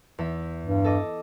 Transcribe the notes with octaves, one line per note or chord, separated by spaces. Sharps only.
E2 E5
G2
A4 D#5 D6